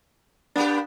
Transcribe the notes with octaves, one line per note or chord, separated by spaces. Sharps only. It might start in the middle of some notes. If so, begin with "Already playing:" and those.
A#3 B3 D4 G4